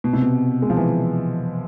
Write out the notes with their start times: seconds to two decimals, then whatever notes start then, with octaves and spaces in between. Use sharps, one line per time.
0.04 B2
0.13 C3
0.22 B2
0.62 G#3
0.70 F3
0.77 E3